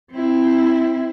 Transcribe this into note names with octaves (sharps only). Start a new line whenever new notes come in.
C4 E4